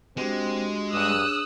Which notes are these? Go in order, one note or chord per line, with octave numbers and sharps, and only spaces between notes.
G#3 C4 D4 F#4 G4
G2 D4 G#4 C#5 D#6 E6 F#6